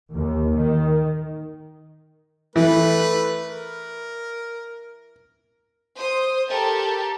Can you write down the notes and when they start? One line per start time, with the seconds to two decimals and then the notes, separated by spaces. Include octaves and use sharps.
0.13 D#2
0.57 D#3
2.56 E3 A3 B4
3.46 A#4
5.97 C5 D#6
6.50 G4 A4 A#4 G5 A5